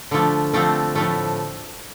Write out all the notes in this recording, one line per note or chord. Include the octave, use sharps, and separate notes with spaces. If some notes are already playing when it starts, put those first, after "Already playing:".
D3 F3 A3
D3 F3 A3 C4
A2 F3 A3